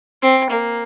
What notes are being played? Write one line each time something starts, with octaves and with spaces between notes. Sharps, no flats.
C4
A#3